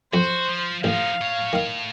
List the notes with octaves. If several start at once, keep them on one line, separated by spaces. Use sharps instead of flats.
F2 F#4 C5
F3
A1 F3 D#4 F5
A2 C#5
D#3 F5